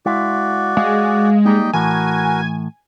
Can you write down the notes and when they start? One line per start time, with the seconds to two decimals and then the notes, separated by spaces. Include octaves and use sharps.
0.06 G#3 E4 F#4 D5 F5
0.77 G#3 G#4 F5
1.45 G3 A#3 D#4 D#5 G5
1.73 A2 E3 F#4 A#4 G#5